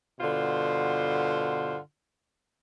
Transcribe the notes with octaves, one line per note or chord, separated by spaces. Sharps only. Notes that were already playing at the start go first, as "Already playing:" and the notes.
G2 B2 D3 F4 C5